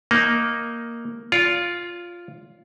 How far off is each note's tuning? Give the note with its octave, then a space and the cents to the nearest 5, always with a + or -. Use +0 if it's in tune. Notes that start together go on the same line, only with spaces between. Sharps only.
A#3 +0 D#4 +0
F4 +0 D5 -40